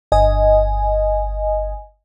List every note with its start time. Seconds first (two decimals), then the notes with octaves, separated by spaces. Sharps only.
0.12 G1 D#5 G#5